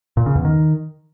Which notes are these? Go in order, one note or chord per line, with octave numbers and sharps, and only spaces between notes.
A#2
C#3
E2
D#3